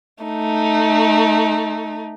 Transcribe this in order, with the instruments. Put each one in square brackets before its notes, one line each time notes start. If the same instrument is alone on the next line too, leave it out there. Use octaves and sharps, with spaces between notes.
[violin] A3 D#4